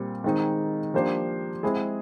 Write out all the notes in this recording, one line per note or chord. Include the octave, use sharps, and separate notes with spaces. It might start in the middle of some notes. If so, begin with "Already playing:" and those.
Already playing: A#2 G3 C4
D#3 G#3 C4 D#4
F3 A#3 D4 G4 C5
G#3 C4 E4 G#4